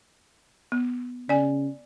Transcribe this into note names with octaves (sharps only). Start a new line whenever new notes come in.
B3
C#3 D5 G#5